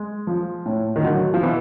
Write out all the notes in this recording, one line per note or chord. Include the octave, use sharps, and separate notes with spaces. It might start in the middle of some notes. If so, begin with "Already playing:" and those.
Already playing: G#3
F3
A2
D#3
D3 F#3
F3
B2 E3